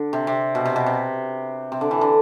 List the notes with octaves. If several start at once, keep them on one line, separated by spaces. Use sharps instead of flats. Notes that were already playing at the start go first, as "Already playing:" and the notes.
Already playing: D3
C3
C3
B2
C3
B2
C3
C3
D3
E3
D3